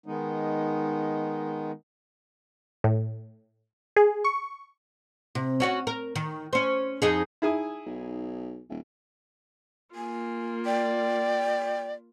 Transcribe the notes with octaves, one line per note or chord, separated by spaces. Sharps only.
D#3 G#3 B3 D#4
A2
G#4
C#6
C3
C#4 F#4 C#5
A#4
D#3
C#4 C5
F2 D#4 G#4
D#4 E4 G#4 G#5 A#5 D#6
B1
D#1
A#3 F4 G#5
D5 G5